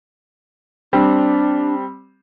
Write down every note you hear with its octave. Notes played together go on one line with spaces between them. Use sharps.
G3 C4 D4